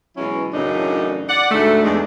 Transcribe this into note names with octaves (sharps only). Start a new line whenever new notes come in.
B2 E3 F#3 G#3 C#4 E4
F#2 A2 C#3 E3 D4 D#4
D5 F#5
D2 G#2 D3 A3
E2 G#3 D4